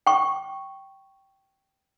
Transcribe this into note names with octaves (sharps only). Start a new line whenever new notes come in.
G5 C#6